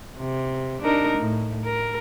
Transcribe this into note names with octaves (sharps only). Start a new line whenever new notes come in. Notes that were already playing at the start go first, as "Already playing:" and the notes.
C3
D4 D#4 A#4
A2
A#4